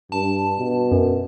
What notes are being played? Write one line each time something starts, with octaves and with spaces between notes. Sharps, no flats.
G2 A5
B2
F#2